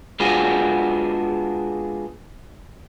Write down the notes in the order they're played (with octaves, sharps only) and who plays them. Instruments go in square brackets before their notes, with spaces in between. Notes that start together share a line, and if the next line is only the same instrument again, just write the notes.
[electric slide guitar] G#3 B3 D4 F4 F#4 G#4